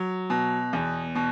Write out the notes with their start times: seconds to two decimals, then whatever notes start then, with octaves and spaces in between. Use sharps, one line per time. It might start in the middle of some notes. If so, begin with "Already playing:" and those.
Already playing: F#3
0.30 B2
0.73 E2
1.15 B2